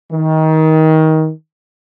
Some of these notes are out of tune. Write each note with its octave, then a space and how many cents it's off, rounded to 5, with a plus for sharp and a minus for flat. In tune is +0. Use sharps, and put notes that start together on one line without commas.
D#3 +25